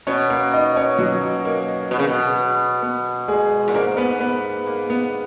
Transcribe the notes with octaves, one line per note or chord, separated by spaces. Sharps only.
B2 C#4 C#5
A#3 A#4
D#4 D#5
C#4 C#5
F#3 F#4
A#3
B2
C#3
B2
B3
G#3 G#4
A#2
G#2 A#3 A#4
B3 B4
B3 B4
A#3
B3